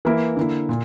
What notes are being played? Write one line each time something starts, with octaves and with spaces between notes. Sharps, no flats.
E3 A#3 E4
D3 A#3 E4
A#2